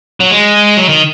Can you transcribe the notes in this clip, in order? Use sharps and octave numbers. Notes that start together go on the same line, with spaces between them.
F#3
G#3
F#3
D#3